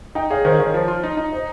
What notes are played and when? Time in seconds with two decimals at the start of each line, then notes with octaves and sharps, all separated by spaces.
0.15 D#4 D#5 G5
0.30 G#4 C#5 F5
0.44 D#3 C5 D#5
0.59 D#3 C#5 F5
0.74 F3
0.88 F4
1.04 D#4
1.17 D#4
1.32 C5 D#5